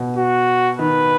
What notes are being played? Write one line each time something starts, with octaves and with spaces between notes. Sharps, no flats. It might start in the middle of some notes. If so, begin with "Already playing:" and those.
Already playing: B2
F#4
D#3 B4